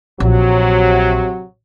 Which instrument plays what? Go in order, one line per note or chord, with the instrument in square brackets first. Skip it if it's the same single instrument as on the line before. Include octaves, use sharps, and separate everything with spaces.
[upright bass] A#1 [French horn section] C3 F#3